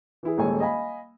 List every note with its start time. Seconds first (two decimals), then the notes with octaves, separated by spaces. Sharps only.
0.23 E3 E4 G#4
0.38 D#1 G#3 A4 C#5 G#5
0.60 D#5 F5 G#5 B5